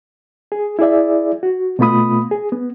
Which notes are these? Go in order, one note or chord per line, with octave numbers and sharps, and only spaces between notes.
G#4
E4 G#4 D5 E5
F#4
B2 A3 B3 F4 B5 D#6
G#4
B3